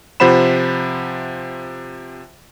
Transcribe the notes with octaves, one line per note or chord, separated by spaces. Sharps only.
C3 F3 C5 F#5 B5 E7